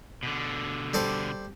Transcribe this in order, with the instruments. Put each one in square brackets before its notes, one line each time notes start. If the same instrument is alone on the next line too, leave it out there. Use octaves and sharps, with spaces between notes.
[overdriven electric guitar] B2 D3
[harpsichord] G3 A4 C5